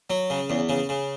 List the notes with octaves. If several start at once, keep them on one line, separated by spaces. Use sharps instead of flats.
F#3
C#3
E2
C#3
C#3